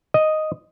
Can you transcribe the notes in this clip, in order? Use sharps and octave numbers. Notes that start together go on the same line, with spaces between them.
D#5